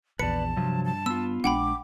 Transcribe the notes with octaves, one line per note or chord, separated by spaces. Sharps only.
A#1 E2 B4 D5 A5 C#7
G2 C3 F3 F#3
A5
B3 F4 E6
A#1 G#3 D4 F#5 G5 B5 D6